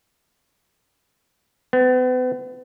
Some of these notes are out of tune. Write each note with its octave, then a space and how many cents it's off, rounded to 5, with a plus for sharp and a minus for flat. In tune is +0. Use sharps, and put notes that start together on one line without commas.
B3 +40